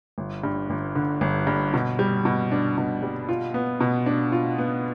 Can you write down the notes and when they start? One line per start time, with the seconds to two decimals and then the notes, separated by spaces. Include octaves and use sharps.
0.18 G1
0.44 G2
0.70 G1
0.95 D3
1.21 G1
1.47 G2
1.74 B2
1.99 G3
2.25 B2
2.51 D4
2.78 B2
3.03 G3
3.29 F4
3.54 B3
3.80 B2
4.06 D4
4.32 F4
4.58 B3